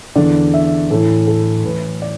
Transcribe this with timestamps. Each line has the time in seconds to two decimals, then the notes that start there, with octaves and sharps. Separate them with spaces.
0.15 E2 D3 D5
0.54 E5
0.90 A2 E3 A4
1.28 A4
1.65 A2 E3 B4
2.02 D5